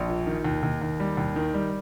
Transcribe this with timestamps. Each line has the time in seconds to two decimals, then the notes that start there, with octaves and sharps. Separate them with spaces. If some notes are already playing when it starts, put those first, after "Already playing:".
Already playing: A#1
0.09 A#2
0.27 D#3
0.45 D#2
0.63 D#2
0.82 D#2
1.00 G3
1.17 D#2
1.36 D#3
1.54 G3